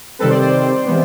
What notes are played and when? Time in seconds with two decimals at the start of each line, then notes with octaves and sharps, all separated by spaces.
0.19 C3 D#3 G3 C4 A4 B4
0.30 C5 D5
0.41 C5 D5
0.86 C3 E3 G#3 B3